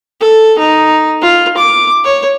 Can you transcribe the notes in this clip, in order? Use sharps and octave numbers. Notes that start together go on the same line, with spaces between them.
A4
D#4
F4
D6
C#5